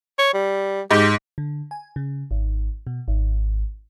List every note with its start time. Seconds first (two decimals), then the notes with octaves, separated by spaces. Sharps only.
0.19 C#5
0.34 G3
0.91 G#2 G4
1.38 D3
1.71 G#5
1.96 C#3
2.31 G#1
2.87 B2
3.08 G#1